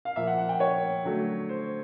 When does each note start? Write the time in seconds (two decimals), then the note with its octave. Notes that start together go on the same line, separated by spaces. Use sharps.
0.05 F5
0.16 A#2 F3 A#3 E5
0.27 F#5
0.38 F#5
0.49 G5
0.60 C#5
1.05 D3 F#3 A3
1.49 C5